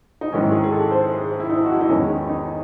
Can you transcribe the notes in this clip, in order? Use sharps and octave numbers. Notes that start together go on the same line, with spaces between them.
D#4
G#2 D#3 G#3 C#4 E4
G#4
G#4
A4
C5
G#4
E4
D#4
F#4
E4
D#4
E2 D#3 G#3 C#4
D#4